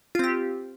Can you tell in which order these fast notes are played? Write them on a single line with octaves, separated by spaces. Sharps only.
F4 C4 G4